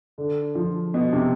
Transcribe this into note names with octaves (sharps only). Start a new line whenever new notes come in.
D3
F3
B2
C3